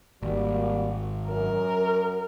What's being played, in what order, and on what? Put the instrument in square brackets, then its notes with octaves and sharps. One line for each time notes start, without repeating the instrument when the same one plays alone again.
[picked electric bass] G#1 [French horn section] G3 A#3 F#4
[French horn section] F#2 [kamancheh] A#4